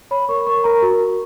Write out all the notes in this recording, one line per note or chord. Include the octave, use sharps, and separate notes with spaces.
C#5 B5
A#4 C#6
A#4 C#6
A#4 A#5
F#4
F#4